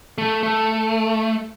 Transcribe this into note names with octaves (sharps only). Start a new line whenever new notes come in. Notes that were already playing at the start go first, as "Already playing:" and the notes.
A3
A3